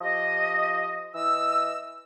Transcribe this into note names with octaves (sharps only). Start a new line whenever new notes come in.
F3 G4 D#5
E3 D#5 E6